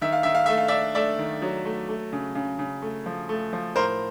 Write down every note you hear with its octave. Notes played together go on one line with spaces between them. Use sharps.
D#3 E5
F5
D#3 E5
F5
A3 E5
F5
D5 E5
D4
A3 D5 E5
D#3
F#3
A3
A3
C#3
C#3
C#3
A3
F3
A3
F3
A2 A#4 C5